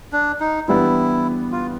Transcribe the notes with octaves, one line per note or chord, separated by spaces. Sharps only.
D4
D#4
E3 G3 B3 D4 E4
F4